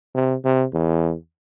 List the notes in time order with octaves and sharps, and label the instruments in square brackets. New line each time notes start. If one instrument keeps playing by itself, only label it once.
[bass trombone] C3
C3
E2